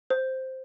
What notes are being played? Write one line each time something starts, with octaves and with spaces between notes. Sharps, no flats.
C5